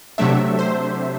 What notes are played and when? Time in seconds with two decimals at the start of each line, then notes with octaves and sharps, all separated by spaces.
0.18 C3 F#3 A3 D4 E5
0.59 C5